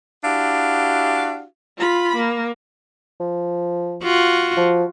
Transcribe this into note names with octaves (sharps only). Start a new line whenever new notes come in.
D4 E4 F#4 G4 F5
F4 B5
A#3
F3
F4 F#4
F3